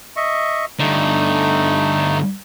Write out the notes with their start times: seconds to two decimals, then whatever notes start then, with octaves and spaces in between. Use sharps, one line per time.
0.17 D#5 E5 C#6
0.79 G2 D3 A3 D#4